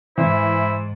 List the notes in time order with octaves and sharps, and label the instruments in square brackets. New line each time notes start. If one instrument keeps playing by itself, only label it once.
[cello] G#2 [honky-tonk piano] E3 [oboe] E4 [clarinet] C5